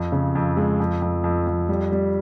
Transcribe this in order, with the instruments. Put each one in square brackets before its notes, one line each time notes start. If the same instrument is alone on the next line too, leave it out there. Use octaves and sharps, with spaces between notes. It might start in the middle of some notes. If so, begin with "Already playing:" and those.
Already playing: [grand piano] F2
C#3
F2
G#3
F2
F2
F2
F2
G3
G3